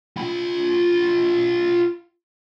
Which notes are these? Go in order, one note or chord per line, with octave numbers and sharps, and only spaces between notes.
F4 B5